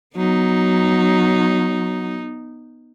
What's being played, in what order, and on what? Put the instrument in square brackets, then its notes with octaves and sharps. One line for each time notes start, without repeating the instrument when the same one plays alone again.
[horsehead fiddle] F#3 [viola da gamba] B3 D#4